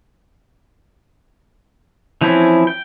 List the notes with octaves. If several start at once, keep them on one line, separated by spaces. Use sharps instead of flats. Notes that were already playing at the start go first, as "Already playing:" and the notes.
E3 F3 C4 C#4 E4
G5